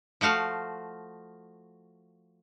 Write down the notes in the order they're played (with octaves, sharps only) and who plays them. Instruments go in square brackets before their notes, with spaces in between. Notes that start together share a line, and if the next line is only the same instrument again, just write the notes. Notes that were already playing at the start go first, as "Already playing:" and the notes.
[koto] F3 A3 F#4 F5